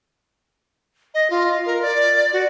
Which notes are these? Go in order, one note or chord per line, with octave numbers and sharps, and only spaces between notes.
D#5
F4
A#4
D5
F#4